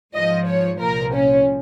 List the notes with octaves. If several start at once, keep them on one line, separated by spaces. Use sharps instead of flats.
G#2 F3 D#5
C#5
C2 A#2 F3 A#4
C#4